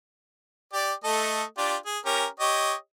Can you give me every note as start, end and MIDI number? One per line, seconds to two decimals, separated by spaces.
0.73 0.93 67
0.73 0.93 74
1.04 1.43 57
1.04 1.43 69
1.04 1.43 75
1.58 1.76 62
1.58 1.76 65
1.58 1.76 67
1.86 1.99 68
2.06 2.26 61
2.06 2.26 67
2.06 2.26 70
2.40 2.74 67
2.40 2.74 73
2.40 2.74 75